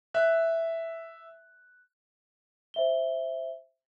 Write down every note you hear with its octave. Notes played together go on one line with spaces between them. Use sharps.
E5 F#6
C5 E5 G7